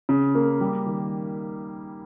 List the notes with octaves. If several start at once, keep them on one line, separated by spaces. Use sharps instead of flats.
C#3
A#3
G3
D#3